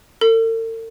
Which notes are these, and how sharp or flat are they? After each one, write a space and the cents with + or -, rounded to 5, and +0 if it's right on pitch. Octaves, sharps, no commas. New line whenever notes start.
A4 +45